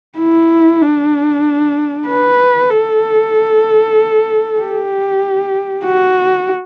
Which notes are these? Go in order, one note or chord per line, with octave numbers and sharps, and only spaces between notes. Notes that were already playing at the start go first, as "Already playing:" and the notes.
E4
D4
B4
A4
G4
F#4